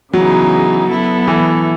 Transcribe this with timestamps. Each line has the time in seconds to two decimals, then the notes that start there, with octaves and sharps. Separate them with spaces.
0.13 C#3 E3 F#3 B3 D#4 G#4
0.89 F#3 B3 E4 A4
1.27 E3